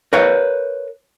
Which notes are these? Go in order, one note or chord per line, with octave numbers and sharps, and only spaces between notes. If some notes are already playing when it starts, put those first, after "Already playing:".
A#4 B4 C#5 F5